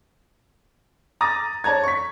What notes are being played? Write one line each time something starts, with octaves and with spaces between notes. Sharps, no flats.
A#5 D6 D#6 A6 A#6
C#5 D5 A5 A#5 G#6
C#6 B6